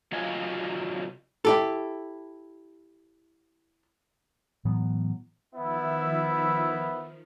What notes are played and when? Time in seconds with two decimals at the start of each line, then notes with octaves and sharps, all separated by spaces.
0.12 C3 F#3 F4 F#4 D#5 G#5
1.45 E4 G4 A4
4.65 A2 E3 F#3 B3
5.55 D#3 F3 B3 E4 E5